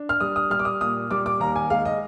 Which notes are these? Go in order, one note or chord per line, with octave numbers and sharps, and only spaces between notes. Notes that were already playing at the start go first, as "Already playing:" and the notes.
Already playing: D4
F6
G3 D#6
D#6
G3 F6
D6
D#6
A#2 D#6
G3 D6
D6
D#2 A#5
G#5
G#3 F5
D#5